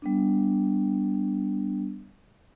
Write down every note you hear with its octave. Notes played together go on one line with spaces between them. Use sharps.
G3 B3 D4